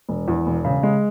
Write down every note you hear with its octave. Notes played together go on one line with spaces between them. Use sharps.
E1
E2
E1
C#3
G#3